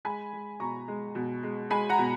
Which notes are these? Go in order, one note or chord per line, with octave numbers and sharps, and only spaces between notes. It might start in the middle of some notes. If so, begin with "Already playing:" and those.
G#3 G#5 B5
G#3
B2 A#5 C#6
G#3
B2
G#3
G#3 G#5 B5
F#5 A#5
B2